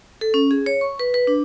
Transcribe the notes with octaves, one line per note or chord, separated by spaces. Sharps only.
A4
C#4
G#4
C#5
C#6
B4
B4
D4